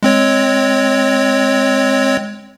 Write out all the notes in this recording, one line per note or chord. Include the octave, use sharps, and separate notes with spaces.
G#3 C4 C#5